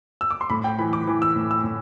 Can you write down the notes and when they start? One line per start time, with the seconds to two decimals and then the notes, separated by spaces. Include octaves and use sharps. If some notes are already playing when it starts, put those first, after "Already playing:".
0.21 E6
0.31 D6
0.41 C6
0.50 A2 B5
0.64 G5
0.79 E3 B5
0.93 D6
1.07 E3
1.22 E6
1.36 A2
1.51 E6
1.64 A2